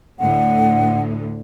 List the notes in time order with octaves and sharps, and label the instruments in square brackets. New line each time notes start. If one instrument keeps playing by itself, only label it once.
[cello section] D2 A2 D3 [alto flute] F#5